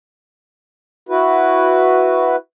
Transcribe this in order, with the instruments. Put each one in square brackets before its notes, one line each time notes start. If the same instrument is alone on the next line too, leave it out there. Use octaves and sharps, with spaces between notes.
[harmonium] E4 F#4 B4